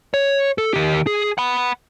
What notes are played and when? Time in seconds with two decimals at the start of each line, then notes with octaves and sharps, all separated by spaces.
0.14 C#5
0.58 A4
0.74 D#3 G4
1.07 G#4
1.38 F#5 B5